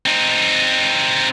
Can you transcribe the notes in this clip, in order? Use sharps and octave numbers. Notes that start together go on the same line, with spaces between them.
C4 D#4